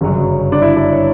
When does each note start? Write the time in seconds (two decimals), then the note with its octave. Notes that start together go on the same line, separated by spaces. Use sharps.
0.01 G1 F#2 C#3 F#3
0.52 D4
0.62 E4
0.76 D4
0.91 C#5